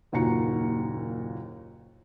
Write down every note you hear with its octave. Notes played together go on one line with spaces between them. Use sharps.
F#1 D#2 A#2 F#4 A#5 C#7